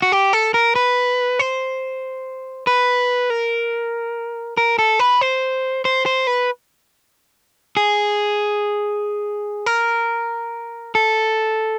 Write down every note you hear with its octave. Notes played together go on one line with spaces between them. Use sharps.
F#4
G4
A4
A#4
B4
C5
B4
A#4
A#4
A4
B4
C5
C5
C5
B4
G#4
A#4
A4